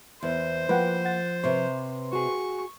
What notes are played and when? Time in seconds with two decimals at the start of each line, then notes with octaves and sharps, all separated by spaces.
0.23 E2 C5
0.69 F3 A#3 B4 F#5 G5
1.05 F#5 A6
1.44 C3 B4 C#5 C6
2.13 F#4 G#4 C#6